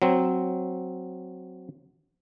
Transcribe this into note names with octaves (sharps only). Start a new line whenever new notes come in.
F#3 C4